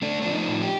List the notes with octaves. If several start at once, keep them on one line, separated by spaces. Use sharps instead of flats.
A3 D4
F3 D4
D#4
A2
G4